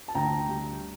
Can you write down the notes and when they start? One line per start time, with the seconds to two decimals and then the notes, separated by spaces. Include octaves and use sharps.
0.08 A5
0.15 D2 G5 A#5
0.48 G3